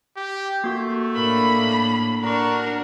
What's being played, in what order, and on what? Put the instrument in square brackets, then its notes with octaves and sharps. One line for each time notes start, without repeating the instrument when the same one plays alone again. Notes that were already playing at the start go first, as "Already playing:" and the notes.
[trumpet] G4
[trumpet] A3 [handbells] A#3 F#4
[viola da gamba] A2 A#3 D4 [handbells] A#4 [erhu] B5
[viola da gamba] D4 [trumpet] F#4 [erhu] A#4 [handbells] A#5 C#6